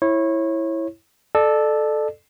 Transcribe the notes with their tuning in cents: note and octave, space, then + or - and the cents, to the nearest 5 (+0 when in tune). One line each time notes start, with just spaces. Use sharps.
E4 +0 C#5 -25
A4 -10 D5 +35